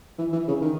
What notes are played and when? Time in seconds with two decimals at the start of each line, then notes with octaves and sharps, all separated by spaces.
0.19 E3
0.33 E3
0.48 C#3
0.62 D#3